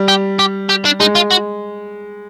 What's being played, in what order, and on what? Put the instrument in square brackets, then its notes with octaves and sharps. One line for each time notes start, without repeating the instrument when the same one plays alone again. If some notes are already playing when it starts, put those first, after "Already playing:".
Already playing: [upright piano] G3
[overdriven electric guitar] G4
G4
G4
D4
[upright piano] G#3 [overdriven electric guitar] D#4
[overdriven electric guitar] F4
F#4